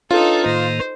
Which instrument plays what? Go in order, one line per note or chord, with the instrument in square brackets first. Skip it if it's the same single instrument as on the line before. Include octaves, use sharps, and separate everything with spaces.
[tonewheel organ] D4 B4 C#5 [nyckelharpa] D#4 A4 [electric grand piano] F4
[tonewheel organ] A2 D#3 A#3 [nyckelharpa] C5